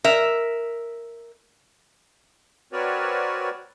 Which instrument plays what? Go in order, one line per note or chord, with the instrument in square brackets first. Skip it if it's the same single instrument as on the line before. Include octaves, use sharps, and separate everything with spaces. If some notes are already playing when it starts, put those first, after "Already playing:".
[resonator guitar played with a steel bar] A#4 E5
[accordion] C4 F#4 A#4 B4 C#5 D5